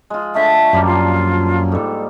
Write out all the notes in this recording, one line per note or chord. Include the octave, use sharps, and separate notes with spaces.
G#3 F4
D3 A3 E5
F#2 F3 G3 A#3
F4
G#2 G3 A4